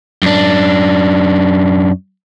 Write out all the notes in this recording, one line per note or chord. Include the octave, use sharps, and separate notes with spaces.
F#2 D4